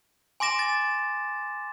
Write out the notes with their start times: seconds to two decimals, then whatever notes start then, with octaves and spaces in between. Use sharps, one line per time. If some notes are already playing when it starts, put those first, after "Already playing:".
0.40 G#5 C6 D6 A#6 E7
0.59 A6